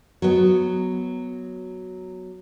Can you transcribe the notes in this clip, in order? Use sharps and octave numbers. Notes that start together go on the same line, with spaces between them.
F#3 B3